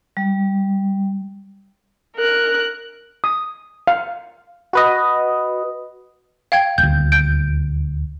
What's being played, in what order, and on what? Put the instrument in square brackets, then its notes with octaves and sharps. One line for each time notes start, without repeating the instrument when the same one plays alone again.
[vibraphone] G3
[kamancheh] A#4 F#6
[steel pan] D#6
F5
[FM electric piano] F#4 B4 D#5
[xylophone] F5 G5 G#6
[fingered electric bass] D#1 D2 [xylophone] G6
[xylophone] G6 D7